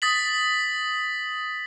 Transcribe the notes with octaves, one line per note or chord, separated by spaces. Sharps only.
D#6 A6 B6 F#7